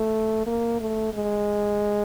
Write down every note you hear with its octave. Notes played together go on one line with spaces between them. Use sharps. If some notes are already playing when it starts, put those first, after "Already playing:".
Already playing: A3
A#3
A3
G#3